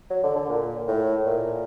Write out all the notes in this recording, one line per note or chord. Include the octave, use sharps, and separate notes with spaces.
F#3
D3
D3
A#2
A2
A#2